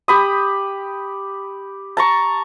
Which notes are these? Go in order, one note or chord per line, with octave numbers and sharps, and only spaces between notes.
G4 B5 D#6
A5 A#5 C#6